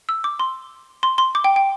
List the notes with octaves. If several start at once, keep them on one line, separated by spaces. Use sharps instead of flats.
E6
D6
C6
C6
C6
D6
G5
G5